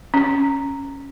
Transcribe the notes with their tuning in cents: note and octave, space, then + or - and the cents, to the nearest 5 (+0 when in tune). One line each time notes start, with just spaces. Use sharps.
C#4 +0